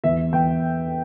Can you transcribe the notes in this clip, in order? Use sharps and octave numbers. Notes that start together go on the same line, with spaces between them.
E2 E5
E2 G5